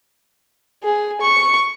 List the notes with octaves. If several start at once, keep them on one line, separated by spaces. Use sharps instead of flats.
G#4
C#6